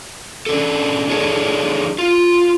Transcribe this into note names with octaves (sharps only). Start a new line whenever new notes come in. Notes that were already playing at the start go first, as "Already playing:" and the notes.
C#4 D4 A4
D4 D#4 G#4 A4 C#5
F4